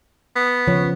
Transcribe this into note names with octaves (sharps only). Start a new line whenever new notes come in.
B3
C#3 F3 C#5